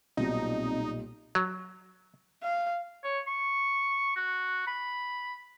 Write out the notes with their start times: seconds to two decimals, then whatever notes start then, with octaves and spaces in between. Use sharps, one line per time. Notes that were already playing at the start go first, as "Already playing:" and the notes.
0.17 B1 A#2 G3 C4 D#4
1.35 F#3
2.43 F5
3.04 C#5
3.27 C#6
4.16 F#4
4.67 B5